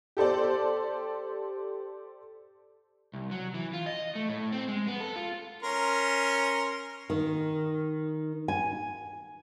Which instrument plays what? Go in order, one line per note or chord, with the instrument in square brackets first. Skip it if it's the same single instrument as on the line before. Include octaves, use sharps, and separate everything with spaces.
[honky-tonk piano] G4 A4 C5 D5
[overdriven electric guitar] C2
F#3
E3
F4
D#5
A3
A2
C4
G#3
B3
A4
F4
[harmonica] C#4 A#4 C6
[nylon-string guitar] D#3
G#5